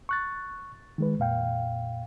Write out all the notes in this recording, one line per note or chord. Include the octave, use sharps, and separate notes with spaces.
C#6 F#6 A6
D#3 G#3 B4
F2 A#2 F5 G5